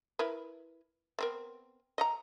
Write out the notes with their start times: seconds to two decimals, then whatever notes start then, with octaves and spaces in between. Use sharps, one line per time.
0.19 E4 A#4 B4
1.19 B3 C4 A#4
1.98 D#5 F#5 A#5